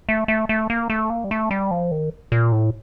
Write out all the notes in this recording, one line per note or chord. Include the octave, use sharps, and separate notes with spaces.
A3
A3
A3
A#3
A3
A#3
G3
A3
G3
F3
D#3
A#2
A2